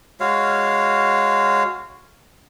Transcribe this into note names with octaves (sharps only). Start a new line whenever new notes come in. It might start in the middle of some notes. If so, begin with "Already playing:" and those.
G#3 F#4 C#5 F5